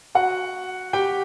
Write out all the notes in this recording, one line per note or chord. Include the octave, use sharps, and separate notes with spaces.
F#4 F#5
G4 G5